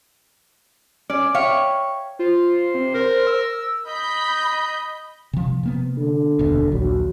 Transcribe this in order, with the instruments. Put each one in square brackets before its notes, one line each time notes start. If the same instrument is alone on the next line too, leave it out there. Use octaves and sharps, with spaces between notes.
[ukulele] C#4 [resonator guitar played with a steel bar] D5
[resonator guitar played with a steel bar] C#5 [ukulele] E5 F5 G5
[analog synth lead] F4 [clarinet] C5
[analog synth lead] C3
[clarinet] A#4 [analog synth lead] C5
[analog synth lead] E6
[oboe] D#5 [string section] B5 G6
[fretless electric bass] C3 F3
C3 A#3 B3
[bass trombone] D3
[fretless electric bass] F1 D#2 B2
[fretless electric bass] A#1 D#2 [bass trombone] F#3